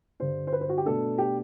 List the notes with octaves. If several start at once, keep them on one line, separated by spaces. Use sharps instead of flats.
G2 D3 G3 C5
C5
B4
C5
F#4
G4
B2 A3 D4 A4
G4